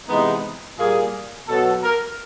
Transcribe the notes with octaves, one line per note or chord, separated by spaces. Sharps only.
C3 E3 G#3 B3 D#4
A#2 G3 A#3 G#4
B2 F#3 B3 A4
A#4